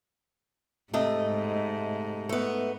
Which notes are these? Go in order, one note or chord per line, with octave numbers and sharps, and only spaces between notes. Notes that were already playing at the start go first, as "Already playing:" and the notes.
G#2 C3 A3 D#5
A3 B3